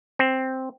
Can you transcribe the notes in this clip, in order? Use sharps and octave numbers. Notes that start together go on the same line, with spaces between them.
C4